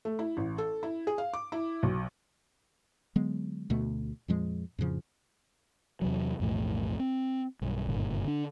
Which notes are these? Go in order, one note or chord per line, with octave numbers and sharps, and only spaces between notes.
A3
E4
A1
A4
E4
G#4
F5
D6
E4
B1
D3 F#3 G#3 B3
D2 B2 A3
F2 A#2 F3 G#3
F2 A2 C#3 F3
E2 C3 F#3
B1 F2 A2 E3
C4
B1 G2
F#1 G2 A#2 D3
D3 D4